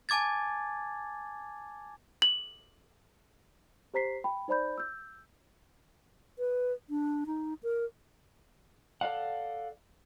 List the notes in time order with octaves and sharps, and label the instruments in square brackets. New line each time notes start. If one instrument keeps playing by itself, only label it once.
[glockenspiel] G#5 A5 D6 G#6 A6
[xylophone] F#7
[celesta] G4 C5 A#5 B6 C7
G5 B5
D#4 C5 D5 B5 G6
E6 G6
[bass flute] B4
D4
D#4
A#4
[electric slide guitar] A4 D5 F5 F#5